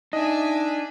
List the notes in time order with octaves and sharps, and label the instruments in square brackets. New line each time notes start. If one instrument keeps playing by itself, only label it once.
[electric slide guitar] D4 [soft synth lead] D#4 [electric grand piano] D#5 [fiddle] E5 G#5